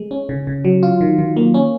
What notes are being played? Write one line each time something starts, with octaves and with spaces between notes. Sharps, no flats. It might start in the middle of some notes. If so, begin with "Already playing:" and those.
Already playing: G#3
C#4
C#3
C#3
F#3
F4
D#3
D#3
A#3
C#4